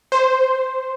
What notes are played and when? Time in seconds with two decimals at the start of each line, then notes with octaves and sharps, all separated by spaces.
0.12 C5